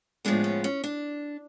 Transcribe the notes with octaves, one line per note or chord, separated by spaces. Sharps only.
A2 F3 G#3 B3 D4
C#4
C#4
D4